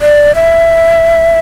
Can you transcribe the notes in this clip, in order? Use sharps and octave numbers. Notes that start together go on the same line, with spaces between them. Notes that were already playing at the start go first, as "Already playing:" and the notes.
D5
E5